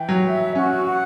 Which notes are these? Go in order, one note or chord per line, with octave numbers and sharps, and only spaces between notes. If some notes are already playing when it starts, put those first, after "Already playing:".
Already playing: E3 G5
F#3
E5
C#4 F#4
F#5